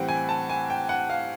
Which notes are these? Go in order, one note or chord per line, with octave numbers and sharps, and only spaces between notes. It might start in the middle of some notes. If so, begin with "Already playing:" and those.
Already playing: A2 E3 G3 C4 F#5 G5
G#5
A5
G#5
G5
F#5
F5